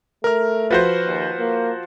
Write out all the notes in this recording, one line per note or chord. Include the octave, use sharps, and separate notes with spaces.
A3 A#4 F6
F3 F#4 B4 C5
D#2
A#3